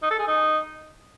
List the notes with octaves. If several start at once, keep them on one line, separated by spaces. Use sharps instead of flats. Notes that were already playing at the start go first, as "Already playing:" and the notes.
D#4
A4
G#4
D#4